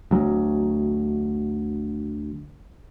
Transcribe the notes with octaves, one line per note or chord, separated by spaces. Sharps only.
D2 F#3